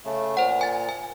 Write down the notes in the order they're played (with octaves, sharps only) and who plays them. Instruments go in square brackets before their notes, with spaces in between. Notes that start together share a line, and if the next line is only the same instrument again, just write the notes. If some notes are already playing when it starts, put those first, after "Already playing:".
[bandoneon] C#3 A3
[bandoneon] A#2 [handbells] C5 F#5
[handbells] G#5 A6
G#5